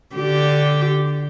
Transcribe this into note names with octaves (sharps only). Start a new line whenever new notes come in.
D3 G4